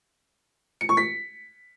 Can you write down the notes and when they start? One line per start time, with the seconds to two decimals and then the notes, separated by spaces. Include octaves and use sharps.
0.81 C#7
0.89 C#6
0.97 B6